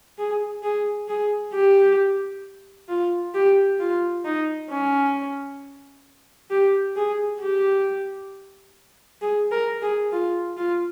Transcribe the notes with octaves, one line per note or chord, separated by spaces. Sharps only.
G#4
G#4
G#4
G4
F4
G4
F4
D#4
C#4
G4
G#4
G4
G#4
A#4
G#4
F4
F4